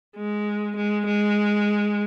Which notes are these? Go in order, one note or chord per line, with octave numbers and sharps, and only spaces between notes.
G#3
G#3
G#3